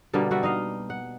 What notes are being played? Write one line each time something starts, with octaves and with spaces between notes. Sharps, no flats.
B2 D3 G3 A#3
G3 F#4 E5 F#5
D#4 D#5 F5
F#5